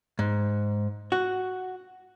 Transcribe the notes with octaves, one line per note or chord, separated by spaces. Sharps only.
G#2
F#4